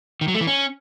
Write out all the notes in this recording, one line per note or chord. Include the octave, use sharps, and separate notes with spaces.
D#3
F#3
A3
E3
C#4